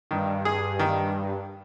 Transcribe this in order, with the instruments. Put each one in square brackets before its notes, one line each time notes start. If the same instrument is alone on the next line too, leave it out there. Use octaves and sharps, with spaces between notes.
[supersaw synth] G2 [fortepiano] D#3
[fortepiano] G#4
D#3